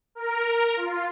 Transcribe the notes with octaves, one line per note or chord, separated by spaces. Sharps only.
A#4
F4